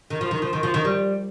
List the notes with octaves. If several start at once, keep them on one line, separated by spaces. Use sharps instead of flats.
D#3
F3
D#3
F3
D#3
F3
D#3
G3